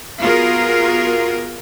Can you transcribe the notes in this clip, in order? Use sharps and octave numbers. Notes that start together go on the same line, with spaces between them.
B3 F4 F#4 G#4 A#4